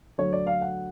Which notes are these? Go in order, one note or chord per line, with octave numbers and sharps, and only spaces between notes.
D2 D3 F#3 C#5
D5
F5
F#5